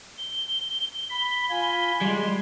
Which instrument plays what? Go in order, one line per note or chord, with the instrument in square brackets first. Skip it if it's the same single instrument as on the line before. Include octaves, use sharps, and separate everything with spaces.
[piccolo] G7
[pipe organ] B5
F4 G#5 B5
[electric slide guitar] G3 G#3 [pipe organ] C6